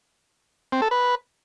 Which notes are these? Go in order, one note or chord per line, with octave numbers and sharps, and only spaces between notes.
C4
A4
B4